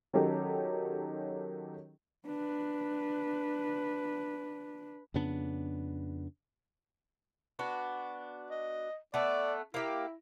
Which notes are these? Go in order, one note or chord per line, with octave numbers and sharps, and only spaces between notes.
D#3 F#3 C#4 D#4 G4 A4
D4 B4
F2 C#3 B3 D4
B3 D4 F#4
D#5
A3 B3 D5
A#3 E4 G4